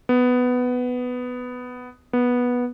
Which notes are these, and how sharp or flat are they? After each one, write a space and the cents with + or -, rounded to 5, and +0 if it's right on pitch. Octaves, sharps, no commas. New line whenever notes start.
B3 +10
B3 -10